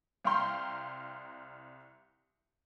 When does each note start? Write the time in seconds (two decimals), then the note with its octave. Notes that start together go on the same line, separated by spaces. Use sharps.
0.25 C2 F5 G5 A#5 C6 G6